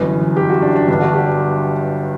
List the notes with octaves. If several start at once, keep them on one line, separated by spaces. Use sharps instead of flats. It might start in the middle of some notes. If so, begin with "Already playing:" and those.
Already playing: G1 F#2 E3
G4
F#4
D4
D4
G1 G2 D3 D4
F#4
G4